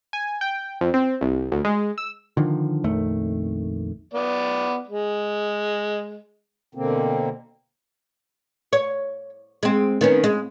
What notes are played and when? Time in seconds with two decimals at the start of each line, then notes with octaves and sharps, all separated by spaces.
0.13 G#5
0.41 G5
0.81 F2
0.94 C4
1.21 C2
1.52 D2
1.64 G#3
1.98 E6
2.37 D3 D#3 F3
2.84 A#1 F2 D#3 A3
4.14 B3 D5
4.87 G#3
6.75 B2 D3 A#3 C4
8.73 C#5
9.63 G#3 C4
10.01 D#3 B3 C#4
10.24 G#3